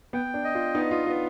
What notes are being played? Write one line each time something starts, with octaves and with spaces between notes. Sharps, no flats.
B3 G5
D4
D#5
F4
B3 D#4
F4
B3 F4